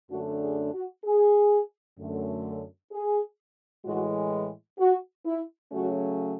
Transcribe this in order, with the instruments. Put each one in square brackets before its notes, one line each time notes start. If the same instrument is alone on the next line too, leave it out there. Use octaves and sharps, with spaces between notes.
[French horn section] F#2 D3 A3 D4 F#4
G#4
F#4
G#4
F#2 D3 A3
G#4
A2 E3 G#3 F#4
F#4
E4
C#3 F#3 A3 C#4 F#4